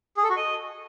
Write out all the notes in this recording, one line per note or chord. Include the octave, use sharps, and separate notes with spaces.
G#4
A4
F#4
D#5